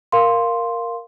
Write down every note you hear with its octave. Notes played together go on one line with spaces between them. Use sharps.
A#4 F5 C6